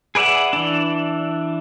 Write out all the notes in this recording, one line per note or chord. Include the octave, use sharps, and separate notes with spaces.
G#4 B4 D5 E5 F#5
E3 D4